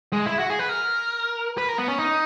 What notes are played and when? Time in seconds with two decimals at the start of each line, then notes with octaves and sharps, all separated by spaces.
0.13 G#3
0.26 E4
0.39 F#4
0.50 G#4
0.59 B4
0.69 A#4
1.58 B4
1.69 A#4
1.78 B3
1.88 C#4
1.98 D#4